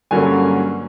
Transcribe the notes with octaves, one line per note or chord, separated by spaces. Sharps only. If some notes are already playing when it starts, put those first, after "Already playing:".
G2 D3 F#3 A#3 C#4 G#5